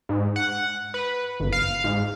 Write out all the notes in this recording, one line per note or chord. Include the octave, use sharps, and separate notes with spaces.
G#2
F#5
B4
G1
F5
G#2